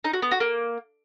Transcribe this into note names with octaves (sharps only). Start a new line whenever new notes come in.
D#4
F#4
B3
F#4
A#3